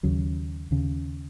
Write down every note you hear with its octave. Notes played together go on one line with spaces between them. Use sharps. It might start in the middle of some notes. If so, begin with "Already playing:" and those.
D#2 C#3 F#3
D#2 C#3